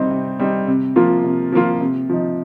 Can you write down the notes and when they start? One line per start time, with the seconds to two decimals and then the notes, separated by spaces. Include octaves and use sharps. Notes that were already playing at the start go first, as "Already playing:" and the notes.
Already playing: C3 G3 C4 D#4
0.11 C3
0.39 G3 C4 D#4
0.68 C3
0.96 F3 A#3 F4
1.24 C3
1.52 F3 A#3 F4
1.81 C3
2.09 F3 D#4